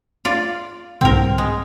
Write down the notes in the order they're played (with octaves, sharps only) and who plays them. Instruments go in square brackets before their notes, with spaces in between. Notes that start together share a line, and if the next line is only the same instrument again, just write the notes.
[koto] F4 D5
[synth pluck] C2 G#2 D3 [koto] C4 A#4
[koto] G#3